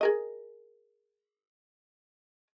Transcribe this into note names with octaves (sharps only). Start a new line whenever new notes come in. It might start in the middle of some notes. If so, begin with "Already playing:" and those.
G#4 A#4 D#5